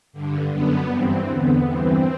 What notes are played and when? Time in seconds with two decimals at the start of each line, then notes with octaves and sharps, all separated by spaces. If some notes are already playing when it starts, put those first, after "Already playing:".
0.13 G2 D3
0.51 F#2 D3 B3
0.89 G2 E3 C4
1.27 E2 D3 B3
1.65 G2 E3 C4